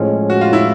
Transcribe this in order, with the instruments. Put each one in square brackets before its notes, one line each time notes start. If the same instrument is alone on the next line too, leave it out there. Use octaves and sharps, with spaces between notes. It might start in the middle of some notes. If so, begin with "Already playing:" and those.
Already playing: [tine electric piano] A2 F3 G#3 C#4
[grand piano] F#4
F4
E4